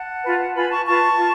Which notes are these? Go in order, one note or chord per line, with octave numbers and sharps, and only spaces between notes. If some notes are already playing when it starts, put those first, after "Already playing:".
Already playing: F#5 A5
F4 B4
F4 B4 G#5 B5
A5 C#6
F4 B4 A5 C#6
F4